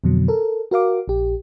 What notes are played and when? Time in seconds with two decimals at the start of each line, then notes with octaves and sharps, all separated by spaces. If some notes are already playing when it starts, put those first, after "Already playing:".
0.04 F2 B2 D3 F#3
0.28 A4 A#4
0.71 F#4 A#4 F5 D6
1.08 A#1 G4